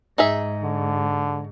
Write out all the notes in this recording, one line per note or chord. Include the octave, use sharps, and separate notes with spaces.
G#2 D#4 G#4 E5
D3